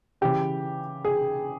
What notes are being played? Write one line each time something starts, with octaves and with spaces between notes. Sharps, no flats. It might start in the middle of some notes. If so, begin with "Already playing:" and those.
C#3 E3 G4
G#4